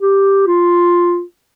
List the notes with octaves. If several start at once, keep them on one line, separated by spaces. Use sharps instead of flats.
G4
F4